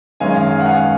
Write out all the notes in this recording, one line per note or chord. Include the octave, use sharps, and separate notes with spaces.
F#2 D#3 G#3 C#4 F5 G#5
F5
F5
F#5
F5 G#5